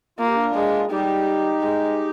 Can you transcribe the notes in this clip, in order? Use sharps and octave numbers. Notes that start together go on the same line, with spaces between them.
A#3 F4
G4
D4 F4
G#3
G3 D#4 G4
G#3